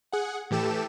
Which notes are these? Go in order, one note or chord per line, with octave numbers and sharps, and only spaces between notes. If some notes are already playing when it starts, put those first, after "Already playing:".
G#4 F#5
A2 E3 G4 A4 E7